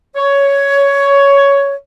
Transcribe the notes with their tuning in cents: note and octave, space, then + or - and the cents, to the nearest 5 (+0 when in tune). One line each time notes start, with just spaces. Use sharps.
C#5 +10